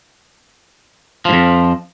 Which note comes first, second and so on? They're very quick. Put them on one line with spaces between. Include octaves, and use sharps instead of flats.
F3 G#2 F2